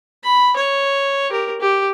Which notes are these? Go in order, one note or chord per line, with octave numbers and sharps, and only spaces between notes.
B5
C#5
G4 A#4
G4